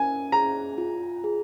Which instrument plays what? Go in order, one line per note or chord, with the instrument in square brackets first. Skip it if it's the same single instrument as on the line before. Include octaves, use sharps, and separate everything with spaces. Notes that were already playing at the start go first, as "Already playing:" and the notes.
Already playing: [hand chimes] C#4 A#4 [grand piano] G#5
[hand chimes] G#4 [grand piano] A#5
[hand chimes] F4
G#4